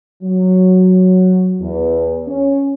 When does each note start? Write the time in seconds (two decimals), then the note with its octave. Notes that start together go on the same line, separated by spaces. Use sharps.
0.22 F#3
1.60 E2
2.27 C#4